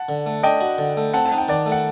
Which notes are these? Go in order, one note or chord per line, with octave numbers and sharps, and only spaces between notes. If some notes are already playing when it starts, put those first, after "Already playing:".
Already playing: F#5 A5
D3
A3
D4 D#5 G5
F#4
D3
A3
C4 F#5 A5
A5
D#4
G5
D#3 D5 F#5
A3
F#5